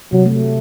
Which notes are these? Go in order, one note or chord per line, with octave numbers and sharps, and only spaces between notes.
C3 F#3
A3